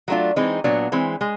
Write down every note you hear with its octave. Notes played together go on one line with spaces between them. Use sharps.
F#3 A3 D4 F4
E3 G#3 C4 D#4
A#2 F#3 B3 D4
E3 G#3 C4
G#3